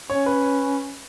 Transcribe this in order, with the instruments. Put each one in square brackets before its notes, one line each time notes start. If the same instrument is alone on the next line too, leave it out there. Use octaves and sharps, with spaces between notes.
[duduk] C#4 [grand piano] C#5
[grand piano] B4